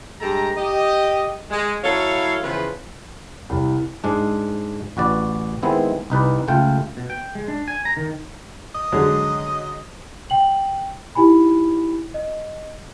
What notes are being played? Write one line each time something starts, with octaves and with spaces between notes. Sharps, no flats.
G2 G#3 G4 A4 A#5
G4 D#5
G#3
F#3 E4 A4 C#5 F5
C#3 E3 F3 B3 F4 B4
C2
G#2 G#3 D4
A1 F#4 B4 D5
D#3 G#3 B3 C4 E4
C2 D#4 B4 D5
C#2 A3 F4 G5
B2
G5
G#3
D4
G#5
A#5
D#3
D#5
D3 F#3 G#3
G5 F#7
D#4 E4 G4 G#5 B5
D#5